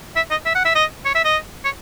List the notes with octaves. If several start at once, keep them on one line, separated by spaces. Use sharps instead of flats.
E5
D#5
E5
F#5
E5
D#5
C#5
E5
D#5
C#5